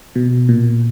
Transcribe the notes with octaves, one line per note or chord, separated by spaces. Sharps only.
B2
A#2